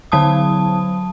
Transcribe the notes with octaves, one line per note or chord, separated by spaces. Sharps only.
D3 F#3 A5 D#6